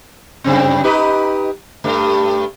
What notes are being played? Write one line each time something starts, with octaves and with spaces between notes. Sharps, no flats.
F#2 C#3 C4
D#4 G4 B4
G2 A3